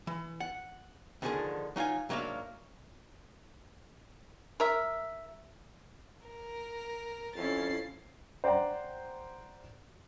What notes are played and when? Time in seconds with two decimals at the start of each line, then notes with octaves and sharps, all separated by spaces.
0.07 E3
0.40 F#5
1.22 D2 D3 D#3 F3 G#4 A#4
1.76 F#3 D#4 F4 F5 G#5
2.09 G#2 F#3 A#3 D4 E5 F5
4.60 A#4 E5
6.27 A#4
7.36 F2 C#4 E4 A6 C7
8.44 C5 D5 F#5 G5 A#5